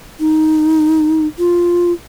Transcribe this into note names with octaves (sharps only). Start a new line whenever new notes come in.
D#4
F4